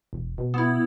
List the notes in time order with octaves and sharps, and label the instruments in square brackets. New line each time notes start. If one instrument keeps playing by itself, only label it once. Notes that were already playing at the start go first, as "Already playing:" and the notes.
[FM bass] E1
B2
[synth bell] B3 E4